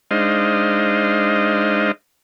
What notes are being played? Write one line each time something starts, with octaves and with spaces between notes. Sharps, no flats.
G#3 D4 D#4 C5 D#5 F5